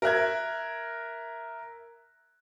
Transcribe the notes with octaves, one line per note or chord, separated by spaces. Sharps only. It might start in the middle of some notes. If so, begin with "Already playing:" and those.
A#4 E5 F#6 G#6